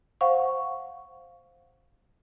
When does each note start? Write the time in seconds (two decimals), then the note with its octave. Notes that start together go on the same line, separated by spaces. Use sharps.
0.21 C5 F5 F#5 C#6